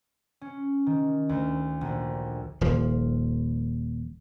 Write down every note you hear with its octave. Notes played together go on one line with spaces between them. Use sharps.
C#4
D#3
D2
A#1
D#1 F3